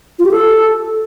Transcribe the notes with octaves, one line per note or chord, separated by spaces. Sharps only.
F4
G4
A4